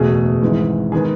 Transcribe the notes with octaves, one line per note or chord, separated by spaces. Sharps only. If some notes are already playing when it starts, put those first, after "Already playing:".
Already playing: F#1 E2 B2 A3 G#4
G#1 G#2 E3 G#3
D#3 G#3 B3 G#4